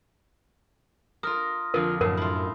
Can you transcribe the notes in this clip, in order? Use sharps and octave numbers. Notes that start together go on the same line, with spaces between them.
F4 A#4 D#6 F6 A#6
F2 D3 F4 A#4
F#2 A2 A#4
E4 F4